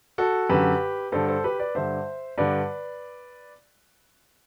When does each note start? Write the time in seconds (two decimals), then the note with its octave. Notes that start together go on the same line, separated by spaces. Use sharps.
0.18 F#4 A4
0.50 F#2 D3 G4 B4
1.12 G2 D3 A4 C5
1.28 A4 C5
1.44 G4 B4
1.59 B4 D5
1.75 G2 D3 C5 E5
2.38 G2 D3 B4 D5